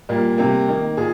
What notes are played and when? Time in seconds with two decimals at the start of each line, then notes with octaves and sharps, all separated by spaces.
0.09 A#2 G3 A#3
0.38 C3 G3 A#3
0.68 D#3 A#3
0.97 A#2 G#4